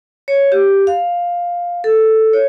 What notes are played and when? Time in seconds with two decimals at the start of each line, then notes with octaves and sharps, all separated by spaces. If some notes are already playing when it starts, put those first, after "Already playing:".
0.28 C#5
0.52 G4
0.87 F5
1.84 A4
2.33 C#5